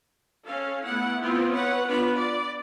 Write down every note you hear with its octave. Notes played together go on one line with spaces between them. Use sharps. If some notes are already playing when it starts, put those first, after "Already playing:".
C#4 A4 F5
A3 B3 E4 F#5
B3 C4 E4 F4
B4 C#5 F#5
B3 D4 F4 B4 B5
D5